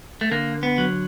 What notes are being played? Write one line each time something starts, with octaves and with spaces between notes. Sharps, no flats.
A3
D3 A#3
B3
F#3